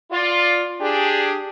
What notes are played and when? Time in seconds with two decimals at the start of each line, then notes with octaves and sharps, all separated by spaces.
0.10 F4 D5
0.81 D4 G4 G#4